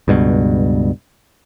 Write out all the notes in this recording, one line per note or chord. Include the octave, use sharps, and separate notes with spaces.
C#2 G2 B2